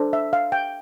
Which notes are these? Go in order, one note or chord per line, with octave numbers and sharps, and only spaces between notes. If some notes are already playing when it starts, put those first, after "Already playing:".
Already playing: D4 A4 C5
E5
F5
G5